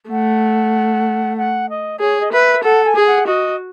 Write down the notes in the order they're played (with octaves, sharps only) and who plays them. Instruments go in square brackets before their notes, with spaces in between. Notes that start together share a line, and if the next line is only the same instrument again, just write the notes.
[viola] A3 [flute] F#5
[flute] F#5
D#5
[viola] G#4 [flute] C#5
[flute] D#5
[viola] B4 [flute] E5
[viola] A4 [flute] F#5
[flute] G#5
[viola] G#4
[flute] F#5
[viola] F#4 [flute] D#5